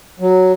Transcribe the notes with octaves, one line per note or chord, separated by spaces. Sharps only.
F#3